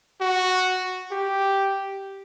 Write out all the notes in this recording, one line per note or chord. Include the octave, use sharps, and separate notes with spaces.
F#4
G4